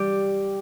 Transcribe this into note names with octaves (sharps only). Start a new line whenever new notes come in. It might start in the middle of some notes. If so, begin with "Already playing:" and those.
Already playing: G3 G4